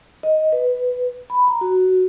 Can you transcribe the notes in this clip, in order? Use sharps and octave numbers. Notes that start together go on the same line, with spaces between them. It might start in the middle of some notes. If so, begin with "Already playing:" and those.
D#5
B4
B5
A#5
F#4